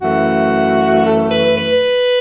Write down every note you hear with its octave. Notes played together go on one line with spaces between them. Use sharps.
F#2 E3 A3 F#4
A4
B4
B4